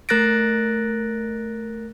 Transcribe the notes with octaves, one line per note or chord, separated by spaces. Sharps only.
A3 A#4 F#6 A6 A#6 D7